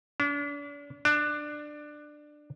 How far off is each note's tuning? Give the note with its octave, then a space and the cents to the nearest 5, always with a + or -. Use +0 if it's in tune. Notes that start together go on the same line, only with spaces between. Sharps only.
D4 -40
D4 +15